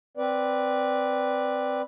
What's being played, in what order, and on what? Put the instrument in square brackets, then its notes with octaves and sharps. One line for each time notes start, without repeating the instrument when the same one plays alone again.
[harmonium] C4 B4 D5